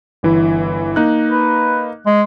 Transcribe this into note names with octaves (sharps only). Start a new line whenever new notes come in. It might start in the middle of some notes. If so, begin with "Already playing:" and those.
G1 E3 E4
A#3 D#4 F#6
B4
G#3